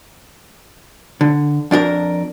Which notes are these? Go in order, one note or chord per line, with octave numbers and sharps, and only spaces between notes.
D3
F2 D4 G4 A#4